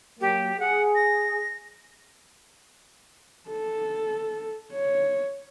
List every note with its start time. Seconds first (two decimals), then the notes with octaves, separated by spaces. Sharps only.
0.20 F#3 A#3 G4
0.59 G#4 F#5
0.95 A#6
3.48 A4
4.73 C#5